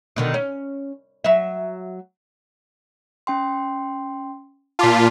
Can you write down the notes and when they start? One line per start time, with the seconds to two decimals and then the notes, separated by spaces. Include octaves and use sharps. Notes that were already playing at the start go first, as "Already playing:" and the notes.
0.16 B2 D3 D#3
0.34 C#4
1.24 F#3 E5
3.27 C#4 G5 C6
4.79 A#2 F4 A5 D6 B6